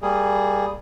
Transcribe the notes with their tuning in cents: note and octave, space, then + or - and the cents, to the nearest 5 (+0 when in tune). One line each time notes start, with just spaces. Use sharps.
G3 +10 A#3 -25 G#4 +0